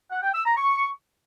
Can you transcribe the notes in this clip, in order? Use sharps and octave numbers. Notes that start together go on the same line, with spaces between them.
F#5
G5
E6
A#5
C#6